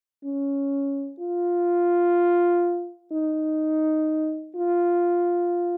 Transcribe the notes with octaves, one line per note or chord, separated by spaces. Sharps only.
C#4
F4
D#4
F4